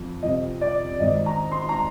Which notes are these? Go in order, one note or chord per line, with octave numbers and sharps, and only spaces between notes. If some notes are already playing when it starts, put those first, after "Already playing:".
Already playing: F2 F3
F2 C3 F3 D#5
D5
G#1 G#2 D#3 D#5
A#5
C6
A#5